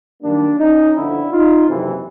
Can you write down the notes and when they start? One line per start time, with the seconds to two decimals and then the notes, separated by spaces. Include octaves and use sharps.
0.22 F#2 D#3 G3 A#3 D4
0.58 C#4 D#4
0.95 G1 F2 D3 D4 E4
1.31 D#4 F4
1.67 F#1 F2 C3 E3